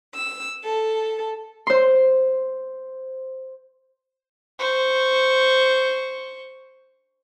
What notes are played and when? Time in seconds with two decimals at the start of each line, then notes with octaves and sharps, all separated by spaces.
0.14 E6
0.63 A4
1.67 C5 C6
4.59 C5 C#6